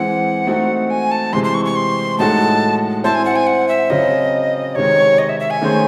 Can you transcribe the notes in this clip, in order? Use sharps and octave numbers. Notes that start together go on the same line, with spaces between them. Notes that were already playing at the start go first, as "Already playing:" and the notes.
Already playing: E3 G#3 C4 F#5
A3 C4 D#4 F#4
G#5
A5
C3 E3 G#3 C4 C6
C6
C#6
C#6
C6
A2 G#3 D#4 F#4 A4 A5
C4 E4 C5 A5
G#5
F#5
G#5
F#5
E5
C#3 F#3 C4 D#5
C3 D#3 G#3 C#5
D#5
E5
E5
G#5
D#3 A3 C#4 G#4 C5